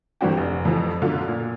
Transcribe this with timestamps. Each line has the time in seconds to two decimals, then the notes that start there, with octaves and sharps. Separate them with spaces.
0.21 G1 E3 G3 C4 F#4 G4
0.37 F1
0.65 F2 E3 F3
1.02 F#2 B2 D3 F4
1.28 A#2